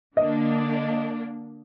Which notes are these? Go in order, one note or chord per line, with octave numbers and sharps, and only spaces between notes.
D3 A#3 D4 D#5